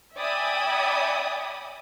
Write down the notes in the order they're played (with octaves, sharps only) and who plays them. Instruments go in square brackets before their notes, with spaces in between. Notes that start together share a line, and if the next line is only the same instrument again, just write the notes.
[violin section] D5 E5 G5 G#5 B5 D#6